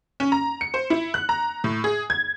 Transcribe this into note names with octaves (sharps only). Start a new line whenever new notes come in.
C#4
A#5
C#7
C5
E4
F#6
A#5
A2
G#4
G#6